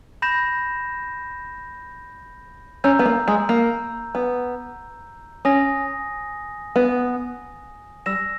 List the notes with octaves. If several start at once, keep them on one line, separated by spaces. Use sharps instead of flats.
B5 G6 A#6 E7
C#4 A#5 E6 G6
B3
A#3
G#3
A#3
B3
C#4 G#5 D#6 A#6
B3
G3 E6 A#6 E7